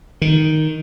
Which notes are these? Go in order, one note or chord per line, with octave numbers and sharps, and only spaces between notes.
D#3